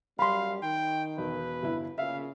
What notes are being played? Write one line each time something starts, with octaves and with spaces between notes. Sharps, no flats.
F#2 G3 F5 B5 C6
D#3 G5
E1 B4
G1 E4
A#2 C#3 E5 F5